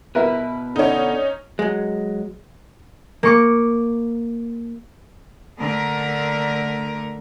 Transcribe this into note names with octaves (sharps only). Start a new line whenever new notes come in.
B2 E4 A#4 B4
D3 C#4 D#4
F#3 G#3
A#3 C#6 D6
D3 A3 A#4